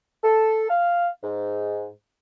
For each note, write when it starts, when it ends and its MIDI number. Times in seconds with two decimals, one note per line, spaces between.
0.23 0.66 69
0.69 1.07 77
1.23 1.87 44